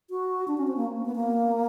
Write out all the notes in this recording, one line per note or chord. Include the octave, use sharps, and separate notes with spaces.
F#4
D4
C#4
C4
A#3
A#3
B3
A#3